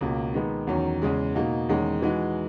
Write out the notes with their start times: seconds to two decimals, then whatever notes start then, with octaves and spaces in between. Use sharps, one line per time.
0.01 C#2 B2 A#3
0.34 D#3 G#3 B3
0.67 E2 D#3 F#3 C#4
1.02 E2 C#3 G#3
1.35 B2 A#3 D#4
1.69 E2 D#3 G#3 C#4
2.02 E3 G#3 D#4 F#4